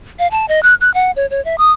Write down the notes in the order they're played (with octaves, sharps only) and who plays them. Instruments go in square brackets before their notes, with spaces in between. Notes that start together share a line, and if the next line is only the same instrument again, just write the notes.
[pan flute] F5
A5
D#5
F#6
F#6
F#5
C#5
C#5
E5
D#6